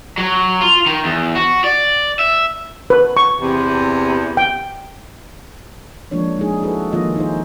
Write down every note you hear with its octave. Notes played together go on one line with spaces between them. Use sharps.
F#3
F4
D#3
E2
F#4
D5
E5
B4
C#6
E2 C3
G5
F3 G#3 A#3 D4 C#5
G#3 D#4 G#4
E4 F#4 G#4 A4 B4
D#3 F3 A#3 F4 D#5
D#4 G#4 C5